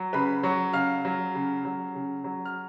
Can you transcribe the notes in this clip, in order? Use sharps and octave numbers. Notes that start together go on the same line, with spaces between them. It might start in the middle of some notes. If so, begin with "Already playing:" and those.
Already playing: F#3
C#3 B4 B5
F#3 C#5 C#6
C#3 F5 F6
F#3
C#3
F#3
C#3
F#3
F6